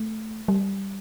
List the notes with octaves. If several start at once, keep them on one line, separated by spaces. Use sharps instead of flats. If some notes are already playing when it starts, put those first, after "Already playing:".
Already playing: A3
G3